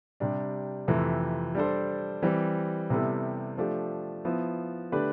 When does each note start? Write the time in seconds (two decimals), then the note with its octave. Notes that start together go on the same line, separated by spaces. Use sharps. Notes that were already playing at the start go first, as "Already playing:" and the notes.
0.20 C3 G3 D4
0.87 F2 C3 E3 A3
1.55 G3 D4 A4 C5
2.22 E3 G3 C4
2.90 C3 G3 B3 E4 A4
3.57 F3 A3 D4 G4
4.25 F3 B3 E4
4.92 D3 A3 D4 G4 B4